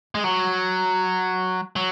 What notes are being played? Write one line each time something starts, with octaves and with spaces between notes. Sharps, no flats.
G#3
F#3
F#3